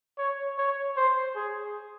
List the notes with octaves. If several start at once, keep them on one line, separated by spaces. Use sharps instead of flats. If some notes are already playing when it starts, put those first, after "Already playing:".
C#5
C#5
C5
G#4